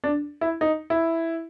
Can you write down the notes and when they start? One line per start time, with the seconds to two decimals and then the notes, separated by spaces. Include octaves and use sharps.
0.04 D4
0.41 E4
0.61 D#4
0.90 E4